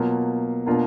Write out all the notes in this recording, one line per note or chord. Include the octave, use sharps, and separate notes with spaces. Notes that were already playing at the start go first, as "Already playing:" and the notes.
Already playing: B2 F#3 A#3 F4
B2 A#3 D4 F4